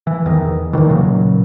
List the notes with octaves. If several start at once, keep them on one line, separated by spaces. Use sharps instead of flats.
E3
E2 D#3
E2 C3 D#3 E3
A#2 C#3 F#3